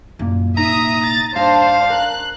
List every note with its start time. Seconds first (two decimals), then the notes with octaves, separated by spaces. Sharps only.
0.19 C2 F#2 A#2
0.57 D#4 E5 A#5 D#6
1.04 A6
1.36 G2 D4 C5 F5 A5
1.90 A#4 F#6